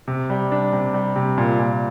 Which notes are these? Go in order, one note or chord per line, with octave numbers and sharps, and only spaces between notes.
C3
G3
D4
C3
G3
C3
A#2
A#2